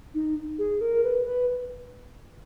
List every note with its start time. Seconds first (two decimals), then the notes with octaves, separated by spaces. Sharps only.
0.14 D#4
0.59 G#4
0.81 A#4
1.04 B4
1.26 B4